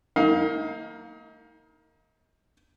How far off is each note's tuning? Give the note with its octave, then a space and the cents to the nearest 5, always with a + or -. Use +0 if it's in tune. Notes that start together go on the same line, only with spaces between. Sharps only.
A#3 -25 D#4 +35 F5 +20